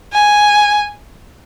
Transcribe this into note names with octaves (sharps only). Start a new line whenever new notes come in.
G#5